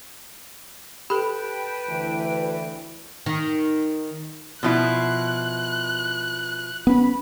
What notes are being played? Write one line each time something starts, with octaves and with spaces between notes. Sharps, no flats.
G4 A4 B4 G5 A5 B5
D2 E3
D#3
B2 F3 E4 F#6
B3 C#4 B5